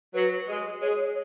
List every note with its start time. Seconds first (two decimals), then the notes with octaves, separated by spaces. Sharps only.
0.14 F#3 B4
0.48 G#3
0.82 G#3 C#5
1.00 C#5